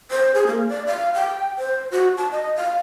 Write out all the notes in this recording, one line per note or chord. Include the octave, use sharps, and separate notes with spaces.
C5
G#4
A#3
D5
F5
G5
C5
F#4
A5
D#5
F5